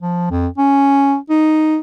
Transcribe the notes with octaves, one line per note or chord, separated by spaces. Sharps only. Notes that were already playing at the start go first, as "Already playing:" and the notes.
F3
F2
C#4
D#4